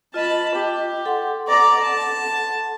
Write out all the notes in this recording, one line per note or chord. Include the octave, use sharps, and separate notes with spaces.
F4 D#5 A5 B5
G4
A4 F#5 C6
D5 A#5
A5